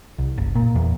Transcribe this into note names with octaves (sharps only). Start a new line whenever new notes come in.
C2
F#1
A#2
E2